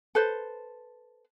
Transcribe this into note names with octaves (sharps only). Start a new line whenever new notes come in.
A4 B4 C5